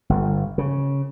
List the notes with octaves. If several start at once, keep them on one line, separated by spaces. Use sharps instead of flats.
G1
C#3